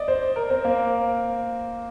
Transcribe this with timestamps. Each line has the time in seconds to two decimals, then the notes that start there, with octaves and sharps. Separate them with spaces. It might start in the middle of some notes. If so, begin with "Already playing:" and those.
Already playing: D5 D#5
0.08 C5
0.36 A#4
0.50 C4
0.65 A#3